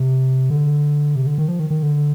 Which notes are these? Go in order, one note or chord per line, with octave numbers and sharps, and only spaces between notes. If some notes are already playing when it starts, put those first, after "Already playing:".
Already playing: C3
D3
C3
D3
D#3
F3
D#3
D#3
D3